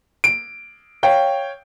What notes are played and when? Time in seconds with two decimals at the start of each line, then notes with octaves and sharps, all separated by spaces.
0.24 D7
1.03 C#5 F5 G5